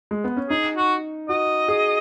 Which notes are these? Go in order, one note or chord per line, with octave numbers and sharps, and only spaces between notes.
G#3
B3
C#4
D#4 G#4
F#4
F#4 D#5
G#4